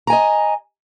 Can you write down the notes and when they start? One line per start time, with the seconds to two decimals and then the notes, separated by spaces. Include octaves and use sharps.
0.07 A#5
0.10 G#5
0.13 D#5